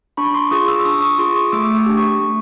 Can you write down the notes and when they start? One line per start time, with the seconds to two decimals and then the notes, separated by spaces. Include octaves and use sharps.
0.17 D4 B5 C#6
0.34 C6 D6
0.51 F4 G#4 C#6 D#6
0.68 D6 E6
0.85 D4 C#6 D#6
1.02 C#6 D#6
1.18 F4 G#4 C6 D6
1.36 C#6 D#6
1.52 A3 D6 E6
1.75 C#6 D#6
1.86 D4 G4
1.97 C#6 D#6
2.20 A3